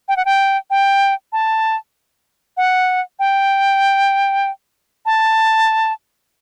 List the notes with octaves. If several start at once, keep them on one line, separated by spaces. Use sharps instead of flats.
G5
F#5
G5
G5
A5
F#5
G5
A5